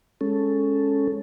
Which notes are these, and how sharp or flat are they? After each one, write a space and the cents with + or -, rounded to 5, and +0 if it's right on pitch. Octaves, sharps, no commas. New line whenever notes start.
G#3 +0 C#4 +0 A4 +0